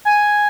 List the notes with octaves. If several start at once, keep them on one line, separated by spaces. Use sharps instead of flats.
G#5